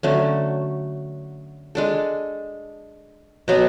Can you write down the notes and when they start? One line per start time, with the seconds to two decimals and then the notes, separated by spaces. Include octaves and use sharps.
0.03 D3 F#3 A3 C#4
1.75 G#3 D4 A4
3.48 B2 F#3 B3